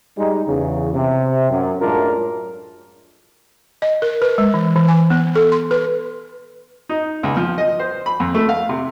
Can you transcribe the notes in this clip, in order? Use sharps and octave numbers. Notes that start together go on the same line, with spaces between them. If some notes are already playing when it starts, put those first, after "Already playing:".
G3 G#3 D#4
E2 C#3
C3
F#2
F#2 A2 G#3 D4 F4 A#4
D#5
A#4
B4
G#3
E3
E3
G#5
B3
A4
C6
B4
D#4
C#2
F3
D#5
C5
B5
F2
A3
F5
C3